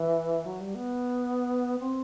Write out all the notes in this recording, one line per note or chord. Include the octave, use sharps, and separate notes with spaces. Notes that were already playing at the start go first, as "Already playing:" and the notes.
Already playing: E3
F#3
G3
B3
C4